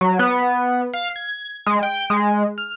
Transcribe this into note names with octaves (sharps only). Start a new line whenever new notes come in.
F#3
B3
F5
G#6
G#3
G5
G#3
F6